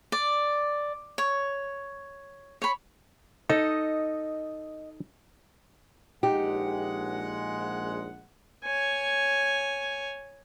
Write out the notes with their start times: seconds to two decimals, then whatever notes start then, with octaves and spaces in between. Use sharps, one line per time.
0.12 D5
1.18 C#5
2.62 C#5 B5
3.49 D#4 A4 D#5
6.23 A#1 G#3 D#4 G4 F#5
8.64 C#5 G#5